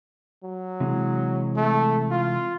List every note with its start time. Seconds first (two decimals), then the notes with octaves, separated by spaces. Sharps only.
0.44 F#3
0.80 C3 E3 G#3
1.56 A3
2.11 F4